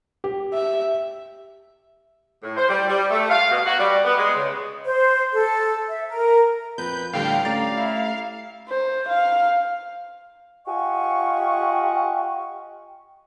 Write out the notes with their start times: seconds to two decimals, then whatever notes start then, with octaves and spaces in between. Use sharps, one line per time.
0.24 G4
0.53 E5
2.43 A2
2.57 C5
2.69 G3
2.88 G3
3.11 A3
3.30 F5
3.52 B2
3.66 F#4
3.79 G3
4.04 B3
4.18 G#3
4.36 C#3
4.85 C5
5.33 A4
5.88 E5
6.08 A#4
6.78 F2 B4 G6
7.13 A2 D3 G3 F5 G5
7.45 A3 C#4 G4 D5 A#5 A6
7.76 E4
8.69 C5
9.09 F5
10.67 F4 G4 D#5 F#5 G#5 C#6